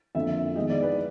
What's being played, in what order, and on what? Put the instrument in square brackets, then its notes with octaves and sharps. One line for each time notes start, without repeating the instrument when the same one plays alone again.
[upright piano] F2 D3 F3 A#3 E5
D#3 G#3 B3 D#5
D5
B4